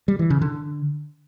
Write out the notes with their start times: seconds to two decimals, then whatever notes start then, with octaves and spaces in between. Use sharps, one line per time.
0.08 G3
0.19 E3
0.30 C#3
0.41 D3